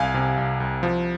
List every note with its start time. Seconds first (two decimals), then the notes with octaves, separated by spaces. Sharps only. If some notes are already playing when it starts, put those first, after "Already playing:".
Already playing: C2 F5 G#5
0.14 C3
0.38 C2
0.60 C2
0.83 F3